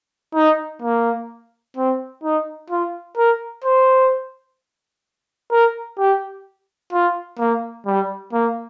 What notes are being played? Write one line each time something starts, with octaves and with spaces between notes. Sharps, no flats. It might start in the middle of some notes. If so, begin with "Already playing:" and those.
D#4
A#3
C4
D#4
F4
A#4
C5
A#4
G4
F4
A#3
G3
A#3